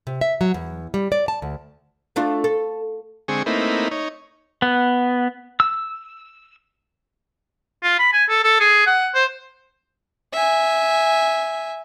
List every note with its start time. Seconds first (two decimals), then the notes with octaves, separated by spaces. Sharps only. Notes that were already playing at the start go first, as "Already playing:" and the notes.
0.07 C3
0.21 E5
0.41 F#3
0.54 E2
0.94 G3
1.12 D5
1.28 A5
1.42 D2
2.16 A3 D4 F4
2.44 A4
3.28 D3 G#3 C4 G#4 C#6
3.46 A3 A#3 C4 D#4 E4 B4
3.91 D#4 C#5
4.62 B3
5.60 E6
7.83 F4
7.99 B5
8.13 G#5
8.29 A4
8.44 A4
8.60 G#4
8.87 F#5
9.15 C5
10.33 E5 G#5